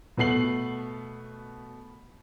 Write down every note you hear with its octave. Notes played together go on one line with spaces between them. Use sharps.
B2 A3 B3 C7 F#7